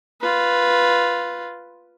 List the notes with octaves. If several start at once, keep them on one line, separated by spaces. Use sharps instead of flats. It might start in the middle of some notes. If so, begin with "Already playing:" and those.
F4 B4